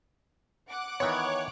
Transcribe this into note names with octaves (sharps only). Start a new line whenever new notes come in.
F#5 D6 F#6
D#3 E3 B3 C#5